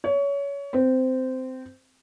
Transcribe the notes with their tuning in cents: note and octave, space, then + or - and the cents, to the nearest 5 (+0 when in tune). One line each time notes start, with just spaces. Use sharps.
C#5 +25
C4 -15